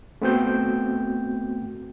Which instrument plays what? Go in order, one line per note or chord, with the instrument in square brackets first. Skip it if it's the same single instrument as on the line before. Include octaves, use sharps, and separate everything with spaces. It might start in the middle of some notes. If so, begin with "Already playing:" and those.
[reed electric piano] A3 B3 C4 F#4 G5 G6